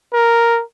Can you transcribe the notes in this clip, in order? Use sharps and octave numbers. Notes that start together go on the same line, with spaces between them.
A#4